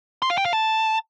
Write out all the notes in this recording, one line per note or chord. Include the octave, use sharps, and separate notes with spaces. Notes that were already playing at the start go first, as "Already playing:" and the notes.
C6
F5
G5
F5
A5